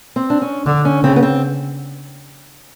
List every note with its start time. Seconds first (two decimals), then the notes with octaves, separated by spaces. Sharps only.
0.16 C4
0.30 D4
0.42 C#4
0.66 D3 D4
0.85 C#4
1.03 C#3 C4
1.16 B3
1.23 C4